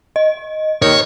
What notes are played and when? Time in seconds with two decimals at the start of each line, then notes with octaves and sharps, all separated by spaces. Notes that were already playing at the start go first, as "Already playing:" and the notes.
0.16 D#5
0.82 D#2 D#3 C#5